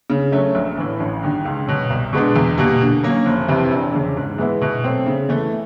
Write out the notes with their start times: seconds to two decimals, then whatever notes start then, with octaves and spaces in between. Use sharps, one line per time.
0.10 C#3
0.32 F#3 A3 C#4
0.55 A#1
0.77 A2 E3
1.00 A1
1.23 G2 D#3
1.45 C#2
1.67 B2 F#3
1.90 C2
2.13 B2 G#3 B3 D4
2.36 E2
2.58 B2 G3 A#3
2.81 D3
3.03 F#3 A#3 C#4
3.26 F1
3.48 F2 C3 E3
3.71 E1
3.94 E2 C#3
4.16 G#2
4.38 E3 G#3 B3 E4
4.61 B2
4.84 F#3 A3 C4
5.06 C#3
5.29 E3 A3